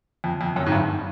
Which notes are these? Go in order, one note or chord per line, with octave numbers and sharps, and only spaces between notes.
F2
F2
F#2
G#2
G2